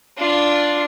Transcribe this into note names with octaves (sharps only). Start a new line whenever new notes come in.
D4 F4